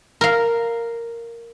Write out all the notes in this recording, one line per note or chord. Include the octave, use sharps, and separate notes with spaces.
A#4 F5